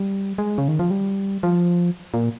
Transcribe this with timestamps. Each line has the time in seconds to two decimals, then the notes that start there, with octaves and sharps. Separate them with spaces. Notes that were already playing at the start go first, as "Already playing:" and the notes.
Already playing: G3
0.38 G#3
0.58 C#3
0.68 D#3
0.79 F3
0.91 G3
1.43 F3
2.14 A#2